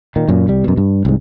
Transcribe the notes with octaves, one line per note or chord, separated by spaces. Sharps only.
A#2 D#3
F#2 A#2
C2 G3
F#2 B2
G2
C2 G#2